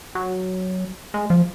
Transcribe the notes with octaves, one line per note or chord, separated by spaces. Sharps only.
F#3
G#3
F3